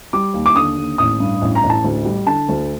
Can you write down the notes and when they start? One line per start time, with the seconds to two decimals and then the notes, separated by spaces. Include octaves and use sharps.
0.13 G3 D6
0.34 D#2
0.46 D6
0.55 D3 D#6
0.77 D#2
0.98 A1 D#6
1.20 G2
1.42 A1
1.55 A#5
1.63 A1
1.70 A5
1.84 D2
2.05 G3
2.26 D3 A5
2.48 D2